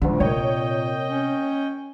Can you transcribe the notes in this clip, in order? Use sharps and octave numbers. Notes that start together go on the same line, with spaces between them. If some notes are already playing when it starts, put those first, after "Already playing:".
D2 A#2 D3 G3 G#3
C3 A#3 C4 C#5 D#5 G5
C#4